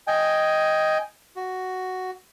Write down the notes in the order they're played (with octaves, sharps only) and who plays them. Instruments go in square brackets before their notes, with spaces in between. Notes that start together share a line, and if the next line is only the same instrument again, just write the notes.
[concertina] D#5 G5 G#5
F#4